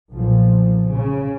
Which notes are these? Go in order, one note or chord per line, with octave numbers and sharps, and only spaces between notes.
B1 A#2 F3
C#3